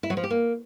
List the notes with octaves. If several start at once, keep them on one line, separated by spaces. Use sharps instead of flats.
E4
F#3
F3
G4
A#3